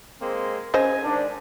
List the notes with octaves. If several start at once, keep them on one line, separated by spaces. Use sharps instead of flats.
G#3 A#3 C4
C#3 C5 D#5 G#5
G#2 D#3 D4